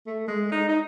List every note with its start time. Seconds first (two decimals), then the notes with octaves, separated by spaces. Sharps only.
0.07 A3
0.28 G#3
0.52 D#4
0.69 D#4